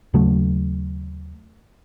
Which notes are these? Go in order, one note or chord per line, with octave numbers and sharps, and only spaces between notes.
D#2 C#3 F#3 A3